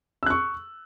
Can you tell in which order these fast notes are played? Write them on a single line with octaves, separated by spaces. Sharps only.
E6 F#6 C#6